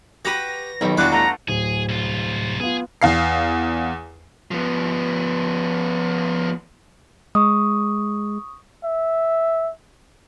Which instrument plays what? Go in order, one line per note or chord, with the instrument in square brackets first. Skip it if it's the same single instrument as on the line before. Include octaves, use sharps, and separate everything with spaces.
[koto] F#4 B4 [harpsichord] G4 [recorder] A#6
[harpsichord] B1 [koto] B2 D#3 G3
[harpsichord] E2 G3 D6 [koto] D4 F4 F#4 [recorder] F#6
[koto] A3 [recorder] F#5 [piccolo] A#5
[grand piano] D1 [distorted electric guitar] G#4
[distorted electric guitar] C2 F4
[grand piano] B3 F4 [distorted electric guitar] G#4
[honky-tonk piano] E2 F5 C7
[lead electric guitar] F3 B3
[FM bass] G#3 [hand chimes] C#6 D#6
[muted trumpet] E5